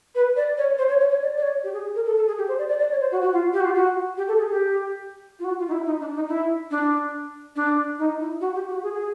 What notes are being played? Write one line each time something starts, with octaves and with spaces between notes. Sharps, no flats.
B4
D5
C#5
C5
C#5
C#5
C#5
D5
D5
C#5
G4
G#4
A#4
A4
A4
G#4
G4
C5
D5
D5
D5
C#5
C5
F#4
F#4
F4
G4
F#4
F4
F#4
G4
A4
G#4
G4
F4
F#4
F4
D#4
E4
D#4
D4
D#4
E4
D4
D4
D#4
E4
F#4
G4
F#4
G#4
G#4